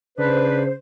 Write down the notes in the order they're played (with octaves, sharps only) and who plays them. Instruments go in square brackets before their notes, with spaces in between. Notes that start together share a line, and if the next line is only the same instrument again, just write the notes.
[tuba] C#3 [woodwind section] D4 B4 [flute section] C5